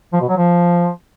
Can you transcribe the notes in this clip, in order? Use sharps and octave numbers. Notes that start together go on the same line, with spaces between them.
F3
B2
F#3
F3